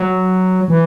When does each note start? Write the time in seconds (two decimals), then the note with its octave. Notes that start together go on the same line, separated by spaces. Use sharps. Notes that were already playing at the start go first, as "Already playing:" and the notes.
Already playing: F#3
0.68 E3